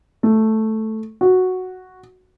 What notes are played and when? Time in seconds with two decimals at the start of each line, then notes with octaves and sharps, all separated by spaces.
0.23 A3
1.21 F#4